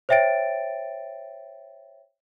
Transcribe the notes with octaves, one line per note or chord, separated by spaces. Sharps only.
C5 C#5 E5 G5 A6 D7